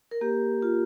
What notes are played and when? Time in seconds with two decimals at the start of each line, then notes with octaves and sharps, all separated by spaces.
0.11 A#4
0.21 A#3 G4
0.62 F4